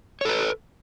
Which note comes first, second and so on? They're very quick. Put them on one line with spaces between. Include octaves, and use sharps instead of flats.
C#5 A4 B4